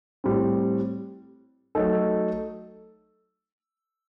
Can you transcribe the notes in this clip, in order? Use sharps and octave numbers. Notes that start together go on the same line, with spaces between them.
A2 G3 C4
F#3 A3 D#4 A4